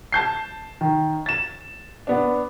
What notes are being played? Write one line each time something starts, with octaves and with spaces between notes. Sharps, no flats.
A5 G6 C7
D#3
A6 E7
B3 D4